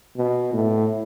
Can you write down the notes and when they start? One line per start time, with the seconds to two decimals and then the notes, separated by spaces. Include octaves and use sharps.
0.17 B2
0.54 A2